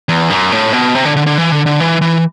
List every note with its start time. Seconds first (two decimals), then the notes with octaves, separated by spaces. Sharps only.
0.09 E2
0.30 F#2
0.52 A2
0.73 B2
0.95 C3
1.05 D3
1.16 D3
1.26 D3
1.38 E3
1.52 D3
1.66 D3
1.80 E3
2.02 E3